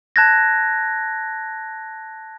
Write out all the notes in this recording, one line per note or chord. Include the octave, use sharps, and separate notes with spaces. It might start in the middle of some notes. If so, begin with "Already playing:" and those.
A5 F#6 G#6 A#6